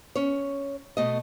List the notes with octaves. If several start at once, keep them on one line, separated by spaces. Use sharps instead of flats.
C#4 C#5
B2 A3 D#5